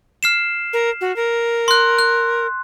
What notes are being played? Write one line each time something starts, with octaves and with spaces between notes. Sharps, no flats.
F6 C7 E7
A#4
F#4
A#4
C6 F#6
F#6